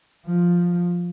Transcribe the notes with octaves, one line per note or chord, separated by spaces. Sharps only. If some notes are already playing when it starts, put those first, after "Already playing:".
F3